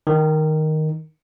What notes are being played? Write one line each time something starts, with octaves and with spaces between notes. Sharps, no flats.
D#3